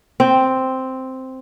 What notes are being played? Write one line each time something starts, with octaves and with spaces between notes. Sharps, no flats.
C4